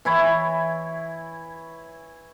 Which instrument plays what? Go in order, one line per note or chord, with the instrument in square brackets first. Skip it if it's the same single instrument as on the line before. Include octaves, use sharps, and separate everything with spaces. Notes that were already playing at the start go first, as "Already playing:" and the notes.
[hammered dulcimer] E3 E4 C#5